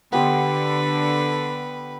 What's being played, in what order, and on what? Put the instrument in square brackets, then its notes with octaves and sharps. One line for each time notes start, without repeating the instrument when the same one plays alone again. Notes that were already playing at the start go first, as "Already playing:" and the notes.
[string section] D3 [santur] B3 G4 C6 [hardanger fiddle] B4